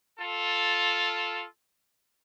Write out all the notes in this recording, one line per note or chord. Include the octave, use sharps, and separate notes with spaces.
F4 A4